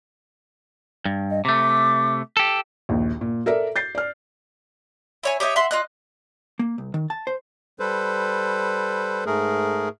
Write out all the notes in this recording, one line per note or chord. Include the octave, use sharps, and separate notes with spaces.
G2
D#5
C3 A3 D6
G4 A4
A#1 D#2
A#2
A4 A#4 D5 E5
G6 A6 C7
D5 F6
E4 C#5 G#5
G4 C#5 D#5 E5
E5 F#5 C6
F4 D#5 F#6
A#3
C2
D#3
A5
C5
G3 A4 B4 C5
G#2 A3 G#4 A#4